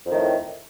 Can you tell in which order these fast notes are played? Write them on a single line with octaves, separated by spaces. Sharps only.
F2 D#3 A2